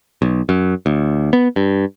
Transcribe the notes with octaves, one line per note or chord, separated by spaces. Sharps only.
B1
F#2
D2
B3
G2